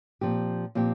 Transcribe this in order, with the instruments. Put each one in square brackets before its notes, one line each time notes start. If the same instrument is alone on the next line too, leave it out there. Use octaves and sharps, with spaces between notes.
[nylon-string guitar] A#2 F3 C4 G4
A#2 F3 C4 G4